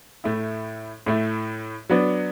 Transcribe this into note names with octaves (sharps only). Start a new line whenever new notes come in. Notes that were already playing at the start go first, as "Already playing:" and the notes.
A2 A3 E4
A2 A3 E4
F#3 B3 D4